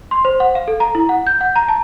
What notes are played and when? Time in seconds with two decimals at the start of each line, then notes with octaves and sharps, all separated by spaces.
0.11 C6
0.25 C5
0.40 F#5
0.55 F5
0.68 A4
0.80 A#5
0.95 E4
1.09 F#5
1.27 G6
1.41 F#5
1.56 A#5
1.69 A5